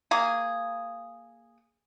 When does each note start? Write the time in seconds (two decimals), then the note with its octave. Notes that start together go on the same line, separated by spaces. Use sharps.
0.11 A#3 G#4